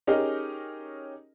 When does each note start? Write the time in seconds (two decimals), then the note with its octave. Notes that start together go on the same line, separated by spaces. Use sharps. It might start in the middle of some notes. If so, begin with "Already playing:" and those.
0.07 C#4 D#4 G4 G#4 A#4 D#5